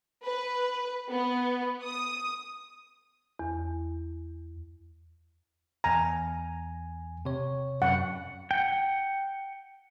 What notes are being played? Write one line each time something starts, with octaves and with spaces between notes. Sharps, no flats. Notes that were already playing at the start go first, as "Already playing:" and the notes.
B4
B3
D#6
E2
E2 G#5 A#5
C3 C#5
F#2 F#5
F#5 G5